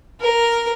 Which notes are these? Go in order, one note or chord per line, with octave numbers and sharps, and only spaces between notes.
A#4